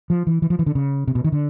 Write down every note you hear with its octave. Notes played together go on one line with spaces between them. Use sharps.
F3
E3
E3
F3
E3
D3
C#3
C3
B2
D#3
D3